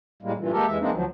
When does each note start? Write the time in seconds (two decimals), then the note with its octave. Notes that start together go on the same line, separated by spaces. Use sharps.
0.23 A2 G3 G#3 A#3
0.37 G2 A#2 E3
0.52 G#3 A#3 G4 A4 A#4
0.66 E2 E3 G#3 E5
0.79 E3 G#3 A#3 C4 D4 D#4
0.92 D2 F3 F#3